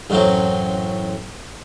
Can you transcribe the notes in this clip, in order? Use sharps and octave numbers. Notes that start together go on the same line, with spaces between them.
A1 F#2 A2 F#3 C4